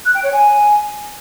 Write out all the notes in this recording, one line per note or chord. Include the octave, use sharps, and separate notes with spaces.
F#6
G5
C#5
G#5